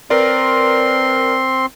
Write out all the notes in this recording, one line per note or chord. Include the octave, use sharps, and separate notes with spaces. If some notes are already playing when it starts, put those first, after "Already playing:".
C4 A#4 B4 D5 C6